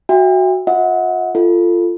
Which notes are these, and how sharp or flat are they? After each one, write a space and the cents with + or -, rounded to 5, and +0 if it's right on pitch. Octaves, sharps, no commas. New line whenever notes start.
F#4 +0 E5 +0 G5 +40
F4 +40 D#5 +45 F#5 -20
F4 -10 A4 +10